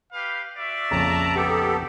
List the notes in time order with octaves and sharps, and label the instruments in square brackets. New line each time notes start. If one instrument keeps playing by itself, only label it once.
[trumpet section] G4 B4 F5
F#4 D5 E5
[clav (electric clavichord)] A#1 F2 C#3 [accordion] A5 A#5
[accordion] B3 G4 A4